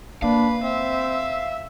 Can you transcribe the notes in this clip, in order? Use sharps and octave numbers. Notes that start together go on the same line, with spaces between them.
A#3 D4 B4 F5
C4 E5